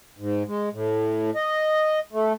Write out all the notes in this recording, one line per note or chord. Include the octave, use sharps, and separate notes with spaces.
G#2
G#3
A2
D#5
A3